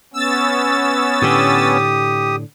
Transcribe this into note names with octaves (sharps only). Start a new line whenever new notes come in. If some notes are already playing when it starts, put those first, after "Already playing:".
B3 C#4 E6 A6
A2 D3 G4 D#6